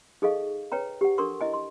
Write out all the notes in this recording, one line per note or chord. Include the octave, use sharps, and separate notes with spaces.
D#4 G#4 A4 D#5 F5 C#6
B4 C#5 G5 A#5
G4 F#5
D4 A4 A#4 C6 C#6
E4 D#5 G#5
C6